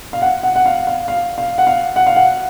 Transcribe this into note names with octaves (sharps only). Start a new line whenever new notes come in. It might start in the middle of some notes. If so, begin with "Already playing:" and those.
F5
F#5
F#5
F#5
F5
F5
F5
F5
F#5
F5
F#5
F5
F#5